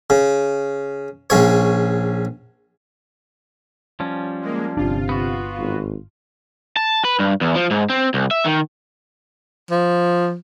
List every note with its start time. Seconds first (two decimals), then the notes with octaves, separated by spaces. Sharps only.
0.10 C#3
1.30 A#1 C#3 C#5
4.00 F3 G3 C#4
4.41 G#3 A#3
4.77 G1 C3 D4 F4
5.09 B3 F#4
5.58 G#1
6.77 A5
7.05 B4
7.19 G2
7.41 E2
7.56 F3
7.71 G#2
7.90 C4
8.14 C2
8.31 E5
8.45 D#3
9.71 F3